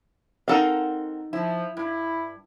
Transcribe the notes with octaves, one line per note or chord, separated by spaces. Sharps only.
C4 D#4 A4 A#4 F5 F#5
F3 E4
G2 E4